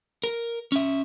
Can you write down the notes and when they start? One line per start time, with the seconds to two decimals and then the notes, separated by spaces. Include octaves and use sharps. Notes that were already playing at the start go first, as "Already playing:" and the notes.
0.24 A#4
0.72 C#4 E5